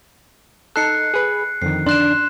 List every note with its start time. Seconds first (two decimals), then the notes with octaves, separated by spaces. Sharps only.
0.76 D#4 A4 F#6 C7 C#7
1.14 G#4 B4
1.62 F2 D3 D#3 C7
1.86 D4 C6 F#6 E7